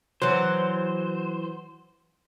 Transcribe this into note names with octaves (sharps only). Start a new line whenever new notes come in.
E3 F#3 C5